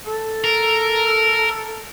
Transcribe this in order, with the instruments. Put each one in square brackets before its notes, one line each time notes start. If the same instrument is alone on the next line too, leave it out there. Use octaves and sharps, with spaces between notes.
[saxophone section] A4
[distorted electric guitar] A#4